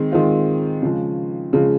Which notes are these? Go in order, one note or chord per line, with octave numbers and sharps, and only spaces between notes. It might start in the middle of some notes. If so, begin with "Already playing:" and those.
Already playing: D#3 G#3 C4
D#3 G#3 C4 F4
C#3 F3 G#3
C#3 F3 G#3